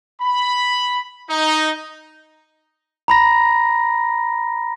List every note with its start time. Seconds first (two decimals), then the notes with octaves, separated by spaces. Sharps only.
0.21 B5
1.29 D#4
3.08 A#5 B5 A#6